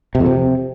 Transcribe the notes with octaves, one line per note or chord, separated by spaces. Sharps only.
C3
F2
C3